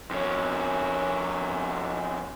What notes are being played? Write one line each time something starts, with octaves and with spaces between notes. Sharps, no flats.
F2 C#4